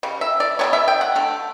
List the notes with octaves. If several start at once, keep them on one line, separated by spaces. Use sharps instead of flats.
C#3 G3
E5
D5
C#3 G3 B3 C#5
E5
G5
F#5
D3 A3